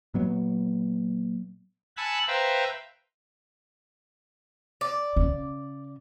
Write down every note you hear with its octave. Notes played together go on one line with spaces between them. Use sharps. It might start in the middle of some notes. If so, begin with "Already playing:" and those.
A#2 F#3 B3
F#5 G#5 A5 B5 E6 F#6
B4 C5 E5 F5 G5 A#5
D5
C#3